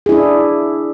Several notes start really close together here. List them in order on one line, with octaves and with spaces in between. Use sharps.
G#4 E4 D4